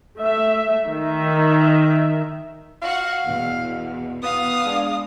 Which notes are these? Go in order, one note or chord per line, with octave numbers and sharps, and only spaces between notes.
A3 E5
D#3 E5
F#4 F5 F#5
E2 B2
B3 F5 D#6
G#3 D4